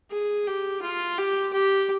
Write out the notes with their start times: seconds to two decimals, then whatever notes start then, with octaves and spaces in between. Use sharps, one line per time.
0.11 G#4
0.47 G4
0.82 F4
1.18 G4
1.53 G4